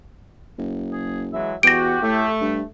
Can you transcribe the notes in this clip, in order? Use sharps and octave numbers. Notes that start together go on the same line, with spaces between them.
F#1
G#4
E3 F#3 G#3 E5
E2 F#4 G4 A#6 D7
A2 A3
G2